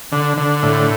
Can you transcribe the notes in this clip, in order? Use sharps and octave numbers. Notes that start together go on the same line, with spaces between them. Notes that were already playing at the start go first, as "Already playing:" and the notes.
D3
D3
A2